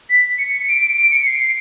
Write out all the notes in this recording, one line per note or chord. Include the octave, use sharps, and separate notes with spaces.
B6
C#7
C#7
D7
D7
D7
C#7
C7